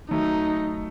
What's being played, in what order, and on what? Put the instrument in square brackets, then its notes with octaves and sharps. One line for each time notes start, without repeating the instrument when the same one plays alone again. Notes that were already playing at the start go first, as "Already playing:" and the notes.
[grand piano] F#3 A3 [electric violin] D#4